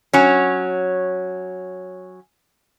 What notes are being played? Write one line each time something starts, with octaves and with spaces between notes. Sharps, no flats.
F#3 C#4